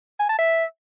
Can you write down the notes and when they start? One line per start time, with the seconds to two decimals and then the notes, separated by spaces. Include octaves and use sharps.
0.20 G#5
0.29 A5
0.39 E5